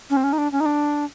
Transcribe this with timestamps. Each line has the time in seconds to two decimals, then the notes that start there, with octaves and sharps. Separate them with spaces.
0.10 C#4
0.17 C4
0.24 C#4
0.33 D#4
0.38 D4
0.52 C#4
0.60 D#4
0.66 D4